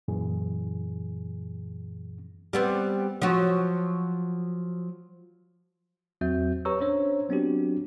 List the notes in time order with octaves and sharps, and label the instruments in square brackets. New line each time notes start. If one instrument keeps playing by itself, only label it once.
[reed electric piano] F#2 A#2 E3 G#4
[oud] G3 B3 C4
F3 F#3 F#4
[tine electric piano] E2 F#3 C4 F#4 E5 G6
G4 B4 C#5 A#5 C#6 E6
C#4 D4 C5 C#5
F#3 B3 C4 D4 F#4 G4